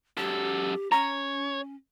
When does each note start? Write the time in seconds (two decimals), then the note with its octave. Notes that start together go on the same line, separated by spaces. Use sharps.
0.17 F#2 G4 A4
0.92 C#4 C#5 A#5